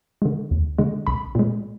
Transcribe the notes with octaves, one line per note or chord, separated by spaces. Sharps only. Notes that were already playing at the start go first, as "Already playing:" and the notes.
D3 G#3
D#2
D3 G#3
B1 B5
A#2 G#3